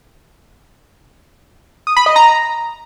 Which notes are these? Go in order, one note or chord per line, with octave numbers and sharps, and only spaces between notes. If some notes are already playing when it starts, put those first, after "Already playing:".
D#6
B5
D#5
A#5